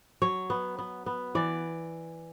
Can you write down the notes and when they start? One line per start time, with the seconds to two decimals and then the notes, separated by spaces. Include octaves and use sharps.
0.22 F#3 C#5
0.50 B3
0.79 B3
1.06 B3
1.35 E3 D5